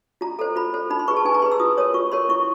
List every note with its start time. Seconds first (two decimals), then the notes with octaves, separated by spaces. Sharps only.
0.21 F4 A#5
0.39 A4 C5 A#5
0.56 F4 B5
0.74 A4 C5
0.90 D#4 B5
0.99 C6
1.08 G#4 B4 C#6
1.17 A5
1.25 D#4 G#5
1.34 A#5
1.42 G#4 B4 C6
1.52 E6
1.60 F4 D#6
1.77 A#4 C#5 D#6
1.94 F4 C#6
2.12 A#4 C#5 C6
2.29 E4 C#6